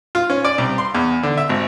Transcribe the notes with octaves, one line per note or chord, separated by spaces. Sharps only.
F4
C#4
D5
C2
C6
E2
D3
E5
G#1